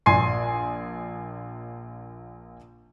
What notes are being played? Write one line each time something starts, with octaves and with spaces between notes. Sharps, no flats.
A#1 G#5 C6 C7